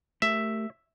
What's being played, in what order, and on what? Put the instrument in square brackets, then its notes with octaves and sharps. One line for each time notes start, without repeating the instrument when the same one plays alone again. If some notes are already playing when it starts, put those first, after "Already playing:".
[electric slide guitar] A3 G4 A#4 [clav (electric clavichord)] E5